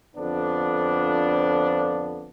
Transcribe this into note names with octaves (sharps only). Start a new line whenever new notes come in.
F2 D3 F3 B3 D4